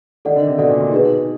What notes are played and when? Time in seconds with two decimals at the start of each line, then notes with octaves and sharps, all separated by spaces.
0.25 D#3 A4 D5 F#5
0.36 D3
0.47 C3
0.58 B2 A4 D5 F#5
0.70 A#2
0.81 A#2
0.92 B2 D#4 G#4 B4